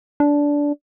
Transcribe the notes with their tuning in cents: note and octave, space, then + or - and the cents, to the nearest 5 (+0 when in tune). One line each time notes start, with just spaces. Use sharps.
D4 -15